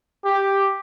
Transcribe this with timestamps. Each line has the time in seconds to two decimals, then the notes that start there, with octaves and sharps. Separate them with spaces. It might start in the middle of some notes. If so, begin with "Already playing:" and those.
0.25 G4